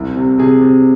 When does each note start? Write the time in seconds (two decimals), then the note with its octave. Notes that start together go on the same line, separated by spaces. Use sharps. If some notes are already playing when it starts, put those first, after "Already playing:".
Already playing: C2
0.16 C3
0.38 C3 G#4
0.61 C3